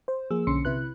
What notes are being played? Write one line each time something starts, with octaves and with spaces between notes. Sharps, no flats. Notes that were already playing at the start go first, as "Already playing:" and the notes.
C5
F3 A#3 G#4 E6
B1 D3 C#4 C6 C#7
C3 E4 B4 F#6